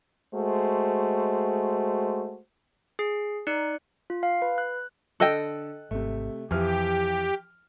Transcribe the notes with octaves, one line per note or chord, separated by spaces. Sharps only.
G#3 A3 F#4 C5
G#4 C7
D#4 D5 F#6 C#7
F4
F5
B4
F#6
D3 A4 D#5 G5 E6 F#6
G#1 C3 A3
F2 E3 F3 G4 F6